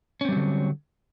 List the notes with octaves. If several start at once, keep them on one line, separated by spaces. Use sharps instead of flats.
D3 F#3 G3 C4 C#4